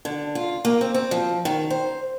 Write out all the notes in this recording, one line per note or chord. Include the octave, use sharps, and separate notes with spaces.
D3
F4
A#3
C4
C4
F3
D#3
C5